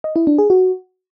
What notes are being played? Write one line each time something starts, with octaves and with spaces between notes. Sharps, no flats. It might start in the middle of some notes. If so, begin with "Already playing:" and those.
D#5
E4
D4
G#4
F#4